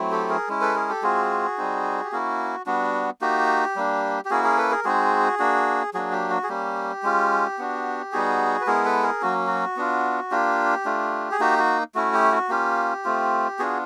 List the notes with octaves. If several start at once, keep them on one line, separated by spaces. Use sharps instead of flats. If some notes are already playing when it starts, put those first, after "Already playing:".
Already playing: F#3 A3 C4 E4
G4 A4
G#4 A#4
G#3 C#4 E4
A4 B4
G#4 A#4
G4 A4
G#3 C4 F4 F#4 G#4
G3 C4 D#4
G4
A#3 C#4 E4 F#4
G3 B3 D4 F#4
A#3 D#4 F#4 G4
G3 A#3 D4
G4
A#3 C#4 E4 F#4 G#4
G#4 A#4
A4 B4
G#4 A#4
G#3 C4 D#4 F#4 G#4
A#3 D4 F#4
F#3 A#3 D4 F#4 G#4
G4
F#4
G#4
G3 A#3 C#4 G4
G#3 C#4 F4
B3 D4 F#4
G3 B3 D#4 F#4 G#4
B4
G#3 B3 E4 G#4 A#4
A4 B4
G#4 A#4
F#3 A#3 C#4 F#4
F#4
B3 D4 F4
A#3 D4 F4 G4
A3 D4 F4
G#4
A#3 D#4 F#4 G4
F#4
A3 C#4 E4 F#4
G4
F#4
A#3 C#4 F4 G4
A3 C4 F4
B3 D4 F4 F#4 G#4